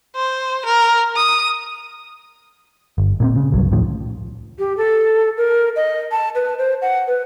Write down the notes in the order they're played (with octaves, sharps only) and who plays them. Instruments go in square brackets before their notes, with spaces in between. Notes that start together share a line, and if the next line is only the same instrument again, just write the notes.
[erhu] C5
A#4
D#6
[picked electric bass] G1
A#2 A#3 C4
C#3
G1 C2 G2 F#3
D#2 A2 D#3 F3
[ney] G4
A4
A#4
D#5
A5
B4
C5
F#5
B4